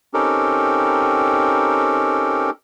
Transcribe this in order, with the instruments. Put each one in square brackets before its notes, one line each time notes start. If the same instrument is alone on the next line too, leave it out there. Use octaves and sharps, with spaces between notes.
[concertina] C4 C#4 D#4 G4 A4 A#4